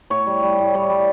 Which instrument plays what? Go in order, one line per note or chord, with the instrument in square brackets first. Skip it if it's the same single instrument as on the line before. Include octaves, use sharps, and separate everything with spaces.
[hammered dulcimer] A2 C#5
G3
G3
A2
G3 C#5
G3